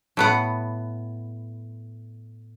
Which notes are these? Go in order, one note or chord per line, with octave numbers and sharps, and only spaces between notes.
A2 B3 F#5